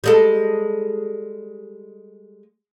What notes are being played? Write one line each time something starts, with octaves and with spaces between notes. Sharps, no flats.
G3 G#3 A4